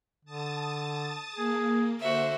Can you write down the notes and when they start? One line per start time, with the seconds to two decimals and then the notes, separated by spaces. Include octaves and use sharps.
0.25 D3 A5 D#6 A6
1.36 A#3 G#4
2.00 D3 F#4 C5 E5